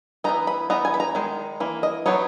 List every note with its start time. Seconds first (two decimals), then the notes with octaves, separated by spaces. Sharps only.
0.24 E3 B3 D#4 A#5
0.47 B5
0.70 E3 B3 D#4 A#5
0.85 G#5
0.94 B5
1.00 A#5
1.15 D#3 G#3
1.60 E3 A#3
1.83 D#5
2.06 F#3 B3 D#4 C#5